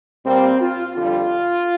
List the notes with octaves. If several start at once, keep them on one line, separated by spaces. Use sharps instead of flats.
A#2 G3 A#3 C4
F4
F2 D3 G3 F4